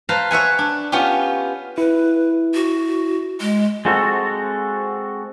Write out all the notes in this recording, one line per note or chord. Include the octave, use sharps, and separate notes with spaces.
B4 C5 F5 A5 A#5
C#5 E5 F#5 G#5
D4
B3 C#4 F4 G4
E4 B4
F#4
G#3
G#3 C4 F#4 A4